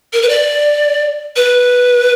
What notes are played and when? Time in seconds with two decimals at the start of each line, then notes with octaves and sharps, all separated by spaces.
0.13 A#4
0.22 B4
0.29 D5
1.36 B4